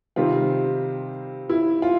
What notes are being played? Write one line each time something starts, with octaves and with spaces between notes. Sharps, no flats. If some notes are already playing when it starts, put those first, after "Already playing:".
C3 D#3 G3 C4 F4
E4
F4